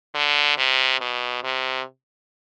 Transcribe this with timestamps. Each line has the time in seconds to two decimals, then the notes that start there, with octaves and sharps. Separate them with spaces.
0.15 D3
0.58 C3
1.01 B2
1.43 C3